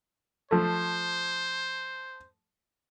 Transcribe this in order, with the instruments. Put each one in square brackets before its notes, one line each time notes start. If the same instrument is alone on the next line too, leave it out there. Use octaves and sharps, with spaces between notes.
[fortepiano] F3 A3 [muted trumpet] C5